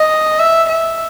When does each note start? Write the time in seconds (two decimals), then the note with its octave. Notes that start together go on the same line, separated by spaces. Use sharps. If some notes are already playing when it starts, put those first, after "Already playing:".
Already playing: D#5
0.39 E5
0.68 E5